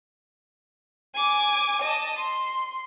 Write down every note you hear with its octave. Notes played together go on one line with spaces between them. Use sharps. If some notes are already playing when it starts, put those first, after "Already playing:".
G#5 D6
D#5 A5
C6